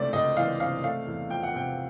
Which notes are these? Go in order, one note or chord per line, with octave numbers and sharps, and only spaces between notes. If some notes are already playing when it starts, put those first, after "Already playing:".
Already playing: C#2 C3 E3 A3 C5 D5
C#2 D#5
E3 F5
C3 F5
A3 F5
E2
F3 G5
F#5
C3 G5